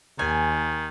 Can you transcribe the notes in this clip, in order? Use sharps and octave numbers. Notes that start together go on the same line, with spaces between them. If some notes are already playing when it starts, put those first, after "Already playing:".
D#2 D#3 G#5